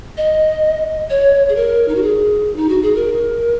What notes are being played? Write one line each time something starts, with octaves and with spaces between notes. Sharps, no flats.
D#5
C#5
G#4
A#4
D#4
F#4
G#4
D#4
F#4
G#4
A#4